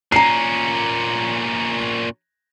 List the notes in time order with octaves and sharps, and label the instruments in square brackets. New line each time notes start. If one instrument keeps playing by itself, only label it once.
[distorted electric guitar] A#2 C#4 [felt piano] A#5 C7